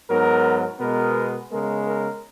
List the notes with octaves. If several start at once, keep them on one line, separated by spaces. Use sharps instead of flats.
G#2 F#3 B3 A#4
B2 G#3 B3 A#4
C#3 G#3 B3 A#4
A#4